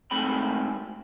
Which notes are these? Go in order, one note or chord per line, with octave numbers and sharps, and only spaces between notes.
G#2 A3 C4 G5 B5